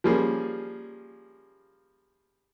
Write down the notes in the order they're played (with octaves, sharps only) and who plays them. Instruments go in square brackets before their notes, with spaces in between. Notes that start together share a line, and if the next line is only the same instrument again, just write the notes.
[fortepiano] F3 G3 A#3 C#4 G#4